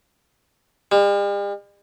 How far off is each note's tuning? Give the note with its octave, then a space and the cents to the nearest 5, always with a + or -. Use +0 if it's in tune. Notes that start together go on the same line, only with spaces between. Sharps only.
G3 +45